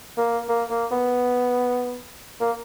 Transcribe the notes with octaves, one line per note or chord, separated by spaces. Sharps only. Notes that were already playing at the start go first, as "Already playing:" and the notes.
A#3
A#3
A#3
B3
A#3